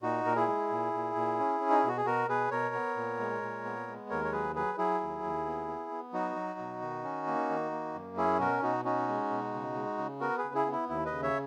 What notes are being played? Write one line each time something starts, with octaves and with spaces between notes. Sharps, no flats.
A#2 D#4 F#4
A#2 A#4
E4 G#4
G#3
A#2
A#2
A#2
C#4
C#4
D#4
E4
B2 F#4
G#4
B2 F#4 A#4
B2 G#4 B4
B2 A#4 C#5
B3
A#2
G#3
A#2
B3
G#3
D#2 A#4 C#5
C#5
F#3 G#4 B4
F#3 G#4 B4
F#3 E4 G#4
D#2
D#2
B3
B3
B3
F#3 D#4 F#4
F#3
B2
D#3
C#4
A#3
D#3
A#3
F#2
C#4 E4 G#4
B2 F#4 A#4
B2 D#4 F#4
C#4 D#4 F#4
G#3
B2
C#3
G#3
C#3
B3 F#4 A#4
G#4 B4
C#3
E4 G#4
B3
E4
D#2 E4
B4 D#5
C#3
C#5 E5